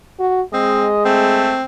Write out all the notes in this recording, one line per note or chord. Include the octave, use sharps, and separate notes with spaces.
F#4
G#3 C4 D#5
A3 C4